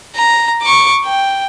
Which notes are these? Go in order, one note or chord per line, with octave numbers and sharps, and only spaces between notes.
A#5
C#6 D6
G5